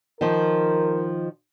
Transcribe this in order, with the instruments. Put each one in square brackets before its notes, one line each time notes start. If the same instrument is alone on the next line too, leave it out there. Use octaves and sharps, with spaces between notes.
[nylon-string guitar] D#3 F3 [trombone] A#4